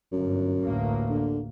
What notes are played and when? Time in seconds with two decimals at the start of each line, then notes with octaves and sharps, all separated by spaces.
0.12 G1 F#2
0.62 A1 D2 A#3
1.10 D3